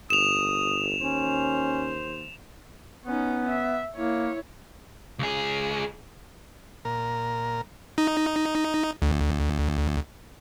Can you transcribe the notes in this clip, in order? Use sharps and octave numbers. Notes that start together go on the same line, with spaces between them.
G1 D#6 E7 F7
D#2 C#4 C5
B3 C#4 D#4
E5
A#3 E4 C#5
C#2 G#4
A#2 A#4
D#4
D2